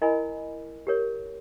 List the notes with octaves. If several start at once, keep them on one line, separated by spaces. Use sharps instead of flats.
E4 A#4 D#5 G#5 B5
G4 A#4 C#5